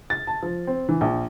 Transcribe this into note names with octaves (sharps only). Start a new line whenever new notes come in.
A6
A5
F3
C4
E3
A#1